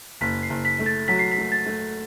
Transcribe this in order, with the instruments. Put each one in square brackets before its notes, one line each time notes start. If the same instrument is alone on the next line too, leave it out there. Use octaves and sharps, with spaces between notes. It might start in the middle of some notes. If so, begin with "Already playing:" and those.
[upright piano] F#1 [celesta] B6
[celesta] C7
[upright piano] F#1
[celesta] B6
[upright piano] A3
[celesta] A6
[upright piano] F#3 [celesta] B6
[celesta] C7
B6
[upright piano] A3
[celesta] A6
[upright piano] A3